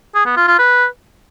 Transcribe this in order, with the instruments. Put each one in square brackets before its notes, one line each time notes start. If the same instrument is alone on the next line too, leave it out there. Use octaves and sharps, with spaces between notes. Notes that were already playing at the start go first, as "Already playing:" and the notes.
[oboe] G#4
B3
F4
F4
B4